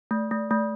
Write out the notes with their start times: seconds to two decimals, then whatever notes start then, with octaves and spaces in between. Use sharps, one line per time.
0.11 A3
0.31 A3
0.51 A3